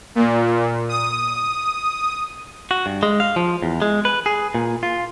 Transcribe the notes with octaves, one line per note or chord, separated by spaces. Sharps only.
A#2
D#6
F#4
G2
G#3
F5
F3
E2
G#3
B4
G#4
A#2
F4